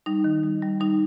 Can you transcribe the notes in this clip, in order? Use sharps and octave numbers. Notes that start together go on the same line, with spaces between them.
G3 D#4
D#3
G3
G3
G3 D#4